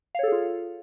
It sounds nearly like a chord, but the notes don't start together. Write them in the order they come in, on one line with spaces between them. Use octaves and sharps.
F5 C#5 A4 G#4 F4